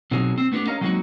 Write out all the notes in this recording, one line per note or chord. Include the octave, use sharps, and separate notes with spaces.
B2 F#3 C4 D#4 G#4
C4
A3 B3 D4 F#4 G4
C#4 A#4 D#5 F5 A#5
F#3 G#3 A#3 C4 D#4 F#4